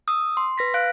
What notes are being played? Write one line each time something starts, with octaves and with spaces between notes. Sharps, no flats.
D#6 E6
C6
B4 A#6 B6
F5 F#6 D7